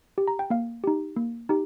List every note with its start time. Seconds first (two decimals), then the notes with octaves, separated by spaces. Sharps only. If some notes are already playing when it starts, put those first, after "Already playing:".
0.18 G4
0.28 A#5
0.39 G5
0.50 A#3 F5
0.84 D#4 G4
1.16 A#3
1.49 D#4 G4